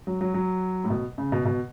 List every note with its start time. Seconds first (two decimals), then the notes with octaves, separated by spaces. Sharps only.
0.07 F#3
0.21 F#3
0.34 F#3
0.84 A2
0.90 B2
1.18 C#3
1.32 B2
1.45 B2